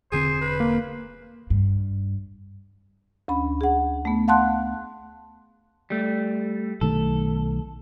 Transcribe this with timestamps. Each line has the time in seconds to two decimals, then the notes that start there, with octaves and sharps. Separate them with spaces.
0.12 E1 D3 C4 G#4 C5
0.41 B4
0.60 A#3
1.50 G2
3.28 D2 C#4 B5
3.61 G#4 F#5
4.05 A3 B3
4.28 F5 F#5 A5 C6 F#6
5.90 G3 A3
6.81 B1 D#3 A3 A4